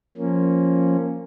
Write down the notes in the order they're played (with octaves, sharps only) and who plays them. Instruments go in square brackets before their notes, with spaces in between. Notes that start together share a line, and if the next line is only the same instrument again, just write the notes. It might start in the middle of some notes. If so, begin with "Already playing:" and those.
[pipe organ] F3 A#3 C#4